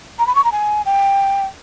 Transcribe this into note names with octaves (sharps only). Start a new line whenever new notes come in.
A#5
B5
C#6
A#5
G#5
G5